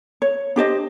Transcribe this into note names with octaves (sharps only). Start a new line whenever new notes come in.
C#5
D4 G4 C5 D#5